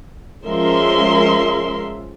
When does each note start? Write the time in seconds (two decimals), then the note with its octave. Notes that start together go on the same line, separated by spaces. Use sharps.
0.45 F3 G#3 C#4 A#4 E5 C6